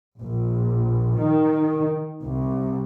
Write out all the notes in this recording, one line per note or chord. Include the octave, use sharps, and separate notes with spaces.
A#1
D#3
C2